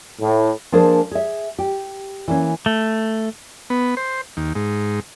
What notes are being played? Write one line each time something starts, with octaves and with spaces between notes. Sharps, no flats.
A2
F3 A#3 D4 G#4 A#4 C5
G#4 E5
G4
E3 A#3 C#4
A3
B3
C5
D#2
G#2